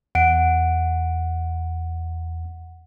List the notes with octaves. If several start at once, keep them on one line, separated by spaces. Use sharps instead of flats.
E2 F#5 D7